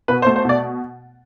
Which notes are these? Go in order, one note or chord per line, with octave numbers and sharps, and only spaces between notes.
B2 B4
C5
A3
C5
B2 D5